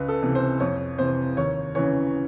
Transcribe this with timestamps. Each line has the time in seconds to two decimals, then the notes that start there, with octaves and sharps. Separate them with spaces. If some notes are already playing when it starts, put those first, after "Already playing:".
Already playing: C#2 B4
0.08 A4
0.22 C3 E3
0.35 C5
0.60 F2 C#5
0.98 C3 E3 C5
1.37 D#2 C#5
1.75 C#3 E3 C#5